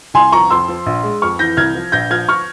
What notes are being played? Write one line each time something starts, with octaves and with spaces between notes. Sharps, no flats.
C2 G#5 C6
F3 A#5 C#6
F2 C6 E6
F3
A#1
G#3
F2 C#6 F6
E3 G6 A#6
C2 F6 G#6
F3
A#1 G6 A#6
F3 F6 G#6
C#6 F6